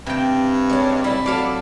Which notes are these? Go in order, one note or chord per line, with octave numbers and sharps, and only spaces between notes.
G2 C3 G5
G#3 C#4
A2 G3 E4
F#3 A4 D5 F5